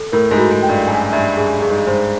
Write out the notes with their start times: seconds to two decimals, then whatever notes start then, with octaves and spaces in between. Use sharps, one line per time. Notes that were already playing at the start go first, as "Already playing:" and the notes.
Already playing: A4
0.12 A2 A#4
0.31 G#2
0.38 F#4
0.51 G#2
0.62 G5
0.69 G2
0.87 F#2 G#5
1.12 G2 E5
1.37 F#2 G#4
1.62 G2 G#4
1.70 G#2
1.78 G2
1.87 G#2 C5